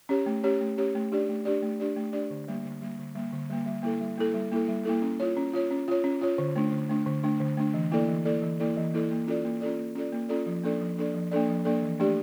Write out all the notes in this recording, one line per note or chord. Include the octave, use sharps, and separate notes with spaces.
C#4 G4 C#5
A3
C#4 G4 C#5
A3
C#4 G4 C#5
A3
D4 G4 D5
A3
D4 G4 D5
A3
D4 G4 D5
A3
D4 G4 D5
D3
G3 A#3
D3
G3 A#3
D3
G3 A#3
D3
G3 A#3
G3
A#3 E4 A4
G3
A#3 E4 A4
G3
A#3 E4 A4
G3
A#3 E4 A4
C#4
F4 C#5
C#4
F4 C#5
C#4
F4 C#5
C#4
F4 C#5
D3
A3 D4
D3
A3 D4
D3
A3 D4
D3
A3 D4
E3
A#3 E4 A4 D5
E3
A#3 E4 A4 D5
E3
A#3 E4 A4 D5
E3
A#3 E4 A4 D5
A#3
C#4 F4 A4 D5
A#3
C#4 F4 A4 D5
A#3
C#4 F4 A4 D5
A#3
C#4 F4 A4 D5
F3
A#3 D4 A4 D5
F3
A#3 D4 A4 D5
F3
A#3 D4 A4 D5
F3
A#3 D4 A4 D5
E3
A3 D4 G4 D5